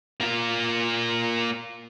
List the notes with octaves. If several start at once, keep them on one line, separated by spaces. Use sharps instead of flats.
A#3 F4